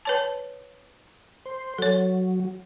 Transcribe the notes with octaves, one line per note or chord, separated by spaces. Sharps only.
B4 C#5 A5
C5
F#3 A4 C#5